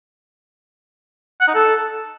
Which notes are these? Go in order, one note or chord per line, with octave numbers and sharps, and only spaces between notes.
F#5
D#4
A4